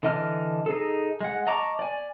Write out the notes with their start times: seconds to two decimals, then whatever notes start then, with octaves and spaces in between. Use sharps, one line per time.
0.03 D3 E3 D#5 A5 F6
0.66 D#4 G#4 A4
1.21 G#3 F#5
1.47 D#5 A5 A#5 C#6 D6
1.79 D5 G#5